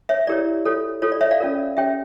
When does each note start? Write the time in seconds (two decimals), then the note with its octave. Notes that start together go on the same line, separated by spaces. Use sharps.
0.09 C#5 E5
0.27 E4 G4 A#4 C#5 D5
0.65 F4 A4 C#5
1.02 F4 A4 C#5
1.12 D5
1.21 C#5 E5
1.31 D5 F5
1.40 C#4 F4 A#4
1.77 C#4 G4 C#5 E5 G5